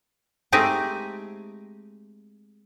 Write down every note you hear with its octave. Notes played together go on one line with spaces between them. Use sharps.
G#3 A3 C4 D#4 G4 G#4